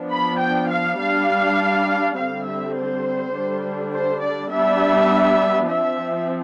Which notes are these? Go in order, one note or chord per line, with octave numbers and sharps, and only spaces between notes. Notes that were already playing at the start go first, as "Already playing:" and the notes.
Already playing: F3 B3 D4
B5
G5
F5
G3 D4 F5
D3 G3 C4 F5
E5
C5
D3 G3 D4
C5
D5
G3 B3 D4 E5
F3 C4 E5